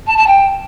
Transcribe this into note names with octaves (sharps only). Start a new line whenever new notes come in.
A5
A5
G5